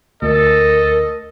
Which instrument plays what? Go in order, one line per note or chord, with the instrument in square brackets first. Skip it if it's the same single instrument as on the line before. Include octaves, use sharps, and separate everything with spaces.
[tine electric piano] D2 [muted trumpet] A4 [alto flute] A#4 [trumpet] D#5